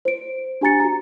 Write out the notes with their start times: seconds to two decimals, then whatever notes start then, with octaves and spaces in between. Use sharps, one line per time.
0.05 C5 D7
0.61 D4 G4 G#5 A#5 A6 C#7
0.80 F#4 A#5